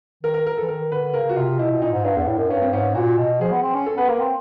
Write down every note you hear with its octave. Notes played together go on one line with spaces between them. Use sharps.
D#3 A#4
A#4
A#4
E3 A4
D#3 A#4
D3 B4
C#3 A#4
F#4
C3 F4
B2 E4
B2
A#2 D#4
G#2
G2 D4
E2
A2
F#2
G2 C#4
C4
G#2 C#4
A#2 F#4
B2
F3 G#4
B3
C4
C#4
A4
B3 B4
A#3 A#4
C4